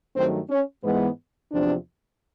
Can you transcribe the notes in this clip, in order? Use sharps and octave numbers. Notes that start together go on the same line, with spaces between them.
G2 D#3 F#3 A3 C4
C#4
G#2 E3 G#3 B3
E2 C3 F3 C4 D4